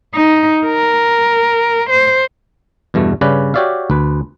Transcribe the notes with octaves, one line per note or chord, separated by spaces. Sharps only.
D#4
A#4
C5
E2 G2 B2 A3
G2 C#3 C#4 B4 D5
F#4 G4 C#5 D5 E5 F5
D2 B4